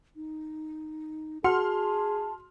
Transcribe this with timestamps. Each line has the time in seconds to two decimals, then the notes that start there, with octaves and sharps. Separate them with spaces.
0.16 D#4
1.44 F#4 G#4 A5 C6 F6